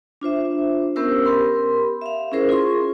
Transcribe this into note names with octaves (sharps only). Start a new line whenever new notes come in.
D4 F4 C5 E5
B3 C#4 G4 A#4 C5 E6
G4 A#4 B5 C6
E5 F5
C#4 E4 G#4 A#4 C5
F4 G#4 C6 C#6